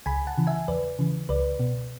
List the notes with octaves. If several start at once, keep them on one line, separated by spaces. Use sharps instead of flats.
C#2 G#5 B5
F#5 A5
C#3 E3
E5 G#5
E2 B4 D5
C#3 E3
C#2 B4 D5
B2